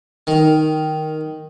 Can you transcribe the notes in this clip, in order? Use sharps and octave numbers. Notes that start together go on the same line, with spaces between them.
D#3